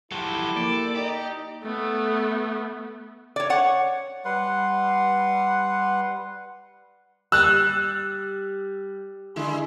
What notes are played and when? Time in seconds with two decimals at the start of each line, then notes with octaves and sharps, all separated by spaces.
0.12 F3 F#3 E4 G4 A4
0.56 A#3 D5
0.95 D#4 G4
1.64 A3 B3
3.36 C#5 D5
3.50 C#5 F#5
4.25 G3 B4 F#5 C6
7.32 G3 E6 F#6
9.36 D3 G#3 E4